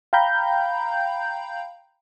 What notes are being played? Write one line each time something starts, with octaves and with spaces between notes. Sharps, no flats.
F5 G5 A#5 B5 G6